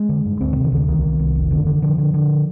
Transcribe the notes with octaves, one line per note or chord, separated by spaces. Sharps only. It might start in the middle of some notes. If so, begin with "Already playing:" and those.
Already playing: G#3
D3
G2
D2 C4
D3
C3
D#3
D2 D3
C2 D#3
C2
C2
F1
D3
D3
D3 F3
D3
D3